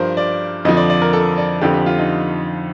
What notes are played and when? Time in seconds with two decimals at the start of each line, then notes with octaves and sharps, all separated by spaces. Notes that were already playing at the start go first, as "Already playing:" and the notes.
Already playing: G2 F3 A#4 C5
0.17 D5
0.65 F2 D3 F3 D#5
0.77 D5
0.90 D5
1.02 A#4
1.13 A4
1.38 D5
1.61 F2 D3 F3 G4
1.74 G4
1.86 F4
1.99 D#4